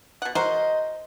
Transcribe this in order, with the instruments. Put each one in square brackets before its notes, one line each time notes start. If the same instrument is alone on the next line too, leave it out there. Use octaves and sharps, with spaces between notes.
[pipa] B2 F#5
[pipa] F#4 A#4 C5 [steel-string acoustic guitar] D#5